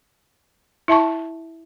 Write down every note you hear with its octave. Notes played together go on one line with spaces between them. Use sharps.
E4 E5 A5 C#6